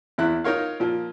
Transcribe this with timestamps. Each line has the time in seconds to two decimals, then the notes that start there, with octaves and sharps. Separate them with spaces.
0.18 E2 E3 E4 F#6
0.44 D#4 F4 A#4 C#5 F5
0.80 A#2 F3